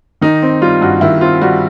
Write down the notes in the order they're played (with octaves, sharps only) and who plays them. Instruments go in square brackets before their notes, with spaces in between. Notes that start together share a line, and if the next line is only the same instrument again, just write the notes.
[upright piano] D#3 D#4
C4
G3 F4
G2 F#4
D#3 E4
C4 F4
G3 F#4